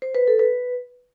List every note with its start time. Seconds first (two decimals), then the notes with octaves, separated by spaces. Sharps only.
0.02 C5
0.15 B4
0.28 A4
0.39 B4